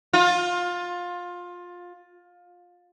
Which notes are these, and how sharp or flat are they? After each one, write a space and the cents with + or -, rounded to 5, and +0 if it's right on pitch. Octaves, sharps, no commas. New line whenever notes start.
F4 +20